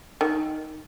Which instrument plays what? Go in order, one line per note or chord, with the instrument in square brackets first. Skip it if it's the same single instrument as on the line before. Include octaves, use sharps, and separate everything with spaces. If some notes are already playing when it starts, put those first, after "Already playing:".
[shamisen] D#3